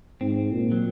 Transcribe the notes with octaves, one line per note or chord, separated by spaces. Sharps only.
G#2 C4
A#2
F#3